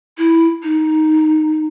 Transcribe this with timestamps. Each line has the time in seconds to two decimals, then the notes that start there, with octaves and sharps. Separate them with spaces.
0.18 E4
0.63 D#4